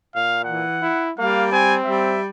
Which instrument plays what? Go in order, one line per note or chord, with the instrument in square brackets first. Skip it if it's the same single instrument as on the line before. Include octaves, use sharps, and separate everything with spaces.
[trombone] A#2 [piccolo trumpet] F5
[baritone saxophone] E3 [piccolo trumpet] F#5
[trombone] E4
[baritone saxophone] G3 [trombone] A#3 [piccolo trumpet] F5
[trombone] C4 [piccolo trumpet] G#5
[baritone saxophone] G3 [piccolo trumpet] E5